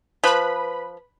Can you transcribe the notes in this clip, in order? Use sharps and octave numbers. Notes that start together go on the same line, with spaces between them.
F3 B4 B5